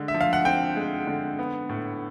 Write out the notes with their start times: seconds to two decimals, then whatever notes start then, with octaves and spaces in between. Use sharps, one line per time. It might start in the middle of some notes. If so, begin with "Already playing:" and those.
Already playing: D3 G#3
0.08 E5
0.14 F3
0.21 F5
0.33 F#5
0.45 C4 G5
0.76 G#3
1.07 D3
1.39 B3
1.69 A2